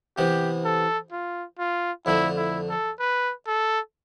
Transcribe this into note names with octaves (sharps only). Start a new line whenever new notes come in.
C3 E3 B3 G4
A4
F4
F4
F2 D3 A3 E4
E4
A4
B4
A4